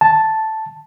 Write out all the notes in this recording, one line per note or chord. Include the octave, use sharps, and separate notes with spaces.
A5